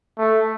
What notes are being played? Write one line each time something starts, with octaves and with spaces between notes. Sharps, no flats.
A3